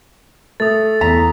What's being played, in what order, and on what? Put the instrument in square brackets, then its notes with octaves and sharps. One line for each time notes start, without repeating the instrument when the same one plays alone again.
[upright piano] A3 [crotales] D#6 A6
[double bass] E2 [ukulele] A#5 [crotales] B6